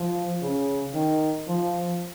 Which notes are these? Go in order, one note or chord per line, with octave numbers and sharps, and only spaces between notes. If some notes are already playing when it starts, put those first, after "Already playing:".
Already playing: F3
C#3
D#3
F3